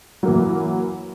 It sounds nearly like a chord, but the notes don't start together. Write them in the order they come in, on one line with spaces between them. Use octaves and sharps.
F#3 A#3 E3